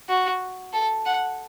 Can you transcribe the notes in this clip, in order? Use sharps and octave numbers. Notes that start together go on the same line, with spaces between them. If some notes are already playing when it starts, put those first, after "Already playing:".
F#4
A4
F#5